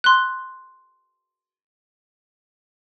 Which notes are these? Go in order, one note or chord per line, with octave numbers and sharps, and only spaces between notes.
C6 F#6